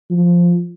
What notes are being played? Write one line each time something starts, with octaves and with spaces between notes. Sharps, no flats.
F3